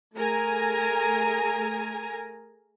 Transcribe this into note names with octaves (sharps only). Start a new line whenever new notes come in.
A3 G#4 A#4 G#5 A#5